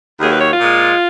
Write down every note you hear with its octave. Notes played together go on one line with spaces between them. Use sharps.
D#2 D#3 F#3 A#3 G#4
B4
C#5
F4
A#2 G#3